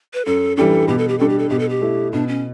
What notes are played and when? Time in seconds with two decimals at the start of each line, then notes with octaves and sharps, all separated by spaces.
0.14 B4
0.25 F#2 A4
0.57 E3 G3 D4 A4
0.88 B2 G4
0.98 A4
1.08 G4
1.19 G3 D4 A4
1.29 G4
1.39 A4
1.49 B2 G4
1.59 A4
1.69 G4
1.81 A3 E4
2.13 B2 D4
2.28 C#4